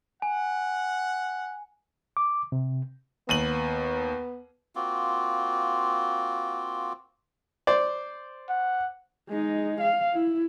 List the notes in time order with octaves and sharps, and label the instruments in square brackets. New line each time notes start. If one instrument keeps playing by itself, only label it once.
[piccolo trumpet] F#5 [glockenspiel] G#5
[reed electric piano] D6
C3
[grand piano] D#2 D#7 F#7 [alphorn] B3
[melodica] A#3 C4 F4 F#4
[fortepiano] C5 D5
[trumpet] F#5
[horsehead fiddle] G#3 D#4
F5
E4